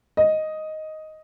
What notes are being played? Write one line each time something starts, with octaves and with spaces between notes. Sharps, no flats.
D#5